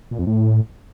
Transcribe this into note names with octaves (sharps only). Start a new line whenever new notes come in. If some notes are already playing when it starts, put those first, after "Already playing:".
A#2
F2
A2